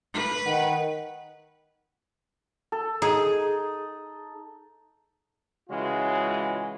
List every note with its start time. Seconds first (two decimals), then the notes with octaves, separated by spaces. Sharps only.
0.13 B4
0.46 D#3 F#5
2.72 A4
3.02 D#4 G#4
5.69 C#3 E3 G#3 C#4 F4 F#4